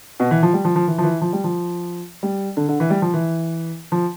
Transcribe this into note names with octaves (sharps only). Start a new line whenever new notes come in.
B2
E3
F3
G3
F3
F3
E3
F3
E3
F3
G3
F3
G3
D3
D3
E3
G3
F3
E3
F3